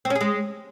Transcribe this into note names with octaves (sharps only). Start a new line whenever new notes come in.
C4
C#4
G#4
G#3